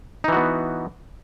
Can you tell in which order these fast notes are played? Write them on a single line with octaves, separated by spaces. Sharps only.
D#4 E3 F#4 B3